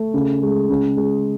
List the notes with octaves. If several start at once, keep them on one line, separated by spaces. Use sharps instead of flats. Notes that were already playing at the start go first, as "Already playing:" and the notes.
Already playing: A3
C#3
G#3
C#3
G#3